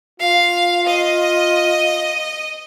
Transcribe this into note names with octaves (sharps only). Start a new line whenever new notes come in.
F4 F5
D#5